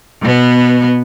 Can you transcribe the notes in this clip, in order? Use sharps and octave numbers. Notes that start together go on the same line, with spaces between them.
B2 B3